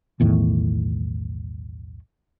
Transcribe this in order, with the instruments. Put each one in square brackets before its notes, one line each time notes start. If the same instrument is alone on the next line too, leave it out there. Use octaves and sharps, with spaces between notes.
[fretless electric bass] B1 E2 A2 D#3